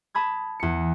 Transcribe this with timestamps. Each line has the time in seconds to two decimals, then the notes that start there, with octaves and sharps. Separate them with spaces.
0.15 A5 B5 D#6 G#6
0.60 E2 C#7